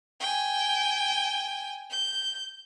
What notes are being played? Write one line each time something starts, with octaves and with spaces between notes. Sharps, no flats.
G5 G#5
G6